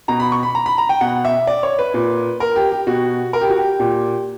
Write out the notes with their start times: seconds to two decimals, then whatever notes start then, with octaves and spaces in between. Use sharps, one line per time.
0.08 B2 A#5
0.20 B5
0.32 C#6
0.43 B5
0.55 A#5
0.66 B5
0.78 A#5
0.89 G5
1.01 B2 F#5
1.25 E5
1.47 D5
1.63 C#5
1.79 B4
1.94 A#2
2.40 A#4
2.56 G4
2.71 G4
2.87 B2 F#4
3.33 A#4
3.41 G4
3.50 F#4
3.57 G4
3.80 A#2